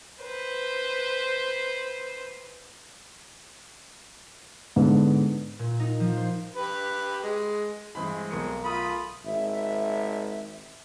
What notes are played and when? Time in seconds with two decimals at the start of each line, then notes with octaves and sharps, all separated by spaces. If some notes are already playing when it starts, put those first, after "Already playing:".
0.22 B4 C5
4.76 G#2 D3 B3
5.59 A#2
5.80 D#4
6.00 F3
6.17 C5
6.56 G4 B4
7.24 G#3
7.95 G2 E3 G#3 C4 D#5 B5
8.31 B1 A#4 C#7
8.64 A3 F4 B5 D#6
9.25 G#1 E5